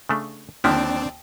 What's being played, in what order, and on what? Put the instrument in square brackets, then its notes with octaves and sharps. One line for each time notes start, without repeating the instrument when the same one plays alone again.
[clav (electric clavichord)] C#3 A3 D4
[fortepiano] D#2 [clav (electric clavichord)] D3 F3 E4 [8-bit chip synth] C4 D4 D5